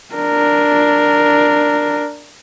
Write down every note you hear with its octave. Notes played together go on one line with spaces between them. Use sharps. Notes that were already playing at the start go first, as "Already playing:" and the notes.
D4 A#4